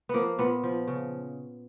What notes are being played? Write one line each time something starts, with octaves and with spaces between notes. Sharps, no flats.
F3 A#3 B3
A#2 B3
F3
C#3